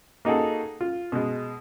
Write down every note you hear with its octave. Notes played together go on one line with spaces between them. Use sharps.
A#3 D#4 F#4 G#4 A4
F4
B2 G#3